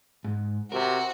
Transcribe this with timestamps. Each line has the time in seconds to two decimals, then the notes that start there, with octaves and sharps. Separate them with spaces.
0.24 G#2
0.72 C3 F#4 A#4